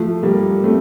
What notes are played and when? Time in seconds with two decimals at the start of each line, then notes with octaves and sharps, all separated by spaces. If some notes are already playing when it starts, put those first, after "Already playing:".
Already playing: F3 A3
0.23 G3 A#3
0.64 A3 C4